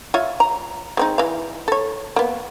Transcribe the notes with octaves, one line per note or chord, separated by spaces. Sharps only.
F4 C#5 E5
A#5
G#3 C4 D#4
E3 F5
A4 C#5
A#3 B3